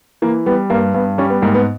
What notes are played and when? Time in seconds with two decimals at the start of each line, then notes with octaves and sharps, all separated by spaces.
0.22 E3 A#3
0.46 G3 B3
0.70 G2 A#3
0.94 G2 B3
1.18 G3 C#4
1.30 B3
1.42 G#2 A#3
1.55 B3